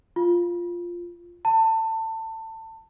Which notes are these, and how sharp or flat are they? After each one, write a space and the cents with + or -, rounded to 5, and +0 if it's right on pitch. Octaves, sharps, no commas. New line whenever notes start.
F4 +0
A5 +25